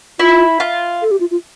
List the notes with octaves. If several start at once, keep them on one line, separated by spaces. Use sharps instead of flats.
E4 F4
F4
A4
G4
F4
F4